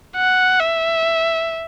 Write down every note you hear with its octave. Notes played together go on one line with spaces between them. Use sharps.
F#5
E5